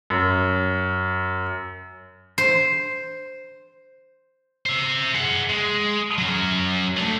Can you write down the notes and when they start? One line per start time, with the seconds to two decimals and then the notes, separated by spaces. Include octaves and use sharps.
0.10 F#2
2.38 C5
4.66 C5 E5
5.15 G#4 F#5
5.49 G#3
6.18 F#3 C#4
6.97 D3 A3